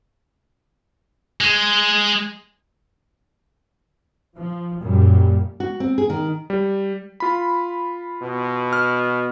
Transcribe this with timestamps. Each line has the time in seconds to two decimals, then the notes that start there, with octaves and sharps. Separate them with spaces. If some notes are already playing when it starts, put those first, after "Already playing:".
1.41 G#3
4.37 F3
4.81 F#2 A#2 G3
5.60 F#4
5.80 C4
5.98 G#4
6.10 D#3
6.50 G3
7.20 F4 B5
8.22 B2
8.73 F6